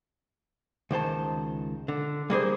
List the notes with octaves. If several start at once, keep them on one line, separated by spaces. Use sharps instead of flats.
C#2 D#3 C5 A5
D3
G3 A#3 G#4 C5